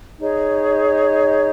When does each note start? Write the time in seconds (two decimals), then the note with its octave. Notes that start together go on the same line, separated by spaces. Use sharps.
0.20 D#4 G#4 C#5